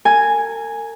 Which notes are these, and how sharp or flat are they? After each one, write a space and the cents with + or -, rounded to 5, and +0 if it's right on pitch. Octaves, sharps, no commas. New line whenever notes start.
A#4 -40 G#5 +0